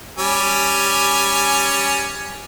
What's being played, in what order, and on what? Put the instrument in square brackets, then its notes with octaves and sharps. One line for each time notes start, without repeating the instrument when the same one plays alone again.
[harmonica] G3 C#4 G#5